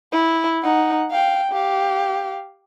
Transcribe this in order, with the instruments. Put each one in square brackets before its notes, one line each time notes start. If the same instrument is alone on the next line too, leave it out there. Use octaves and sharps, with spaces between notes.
[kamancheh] E4
D#4 F#5
F5 G5
G4 F5